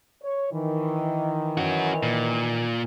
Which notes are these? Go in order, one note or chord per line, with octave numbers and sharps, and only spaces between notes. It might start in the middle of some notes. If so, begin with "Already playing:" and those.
C#5
D#3 E3
C#4 F#4
A#2